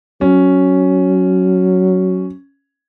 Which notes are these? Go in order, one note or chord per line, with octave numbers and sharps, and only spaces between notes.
F#3 C#4